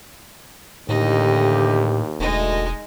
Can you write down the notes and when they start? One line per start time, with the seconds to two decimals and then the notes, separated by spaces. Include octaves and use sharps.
0.89 D#2 A2 D3 E3 D#4 G4
2.20 E1 D2 G#3 D#4